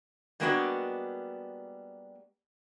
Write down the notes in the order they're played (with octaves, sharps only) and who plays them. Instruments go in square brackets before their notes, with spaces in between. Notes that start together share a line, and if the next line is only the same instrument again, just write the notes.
[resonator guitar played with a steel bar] G3 G#3 A#3 B3 D4 F#4